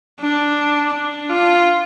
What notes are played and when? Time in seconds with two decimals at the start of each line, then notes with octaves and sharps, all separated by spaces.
0.21 D4
0.93 D4
1.30 F4